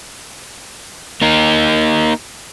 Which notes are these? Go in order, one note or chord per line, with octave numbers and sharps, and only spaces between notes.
A#3 D#4